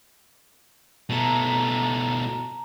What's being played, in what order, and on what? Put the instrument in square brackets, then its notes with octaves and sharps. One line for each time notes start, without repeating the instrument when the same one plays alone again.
[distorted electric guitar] B2 A3 [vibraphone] A5 A#5